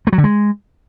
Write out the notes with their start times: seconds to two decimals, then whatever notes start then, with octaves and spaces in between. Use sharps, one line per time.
0.07 A3
0.13 F#3
0.18 D3
0.24 G#3